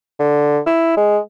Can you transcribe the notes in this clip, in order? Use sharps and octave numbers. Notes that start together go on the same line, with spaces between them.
D3
E4
G#3